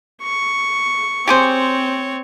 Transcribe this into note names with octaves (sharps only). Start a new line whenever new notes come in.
C#6
C4 G4 G#4 C5 C#5